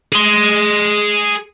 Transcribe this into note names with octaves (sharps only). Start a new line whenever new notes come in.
G#4 C6